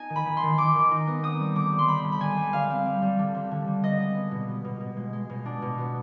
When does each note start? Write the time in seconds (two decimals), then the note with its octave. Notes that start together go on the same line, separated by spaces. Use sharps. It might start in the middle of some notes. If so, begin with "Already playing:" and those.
Already playing: B3 D#4 G#5
0.10 D#3
0.16 B5
0.26 D#3
0.37 C6
0.43 D#3
0.58 D#3 D6
0.75 D#3
0.91 D#4
1.07 B3
1.23 C4 D#6
1.40 G3
1.55 D3 D6
1.72 G3
1.79 C6
1.88 C4 B5
2.04 D3
2.12 B5
2.20 D3 G#5
2.37 G3
2.53 G3 F5
2.70 C4
2.86 G3
3.02 G3
3.19 D3
3.35 C4
3.51 D3
3.67 G3
3.83 B3 D#5
4.00 G#3
4.15 B3
4.31 B2
4.48 B3
4.64 B2
4.81 B2
4.97 G#3
5.13 G#3
5.30 B2
5.46 D4
5.62 B2
5.78 B3